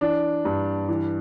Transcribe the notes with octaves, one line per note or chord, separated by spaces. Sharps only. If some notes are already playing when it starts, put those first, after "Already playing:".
E3 D4
G2
E3